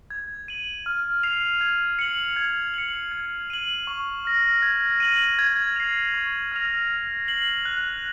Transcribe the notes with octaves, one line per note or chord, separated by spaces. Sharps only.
G#6
D#7 F#7
F6
C7 F7
G#6
C#7 F#7
G#6
C#7 F#7
G#6
D#7 F#7
C#6
F6 A#6
G#6
D#7 F#7
G#6
C7 F7
C#6
F6 A#6 F7
F6
C7 F#7
F#6